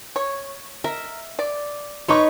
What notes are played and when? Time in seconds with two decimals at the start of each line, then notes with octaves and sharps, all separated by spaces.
0.16 C#5
0.84 A#4 E5
1.39 D5
2.09 D#4 B4 C#5 C6 C#6